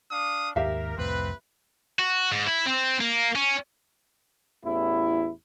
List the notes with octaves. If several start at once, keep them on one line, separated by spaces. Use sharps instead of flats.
D4 F5 D#6
D#2 G#2 G4 A#4 E5 F5
C2 F2 A2 C4 B4
F#4
G#2
E4
C4
A#3
C#4
A1 E2 E4